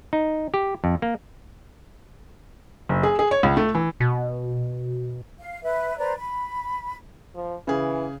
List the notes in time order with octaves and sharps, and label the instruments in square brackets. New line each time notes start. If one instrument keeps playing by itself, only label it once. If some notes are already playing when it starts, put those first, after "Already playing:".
[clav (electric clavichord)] D#4
G4
F2
A#3
[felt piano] F#1
G#4
G#4
C#5
C#2
A3
E3
[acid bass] B2
[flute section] F5
B4 E5
B4 C5 D5 A#5
B5
[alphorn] F3
[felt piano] C#3 G#4 [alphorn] E3